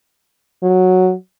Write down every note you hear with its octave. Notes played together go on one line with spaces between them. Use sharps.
F#3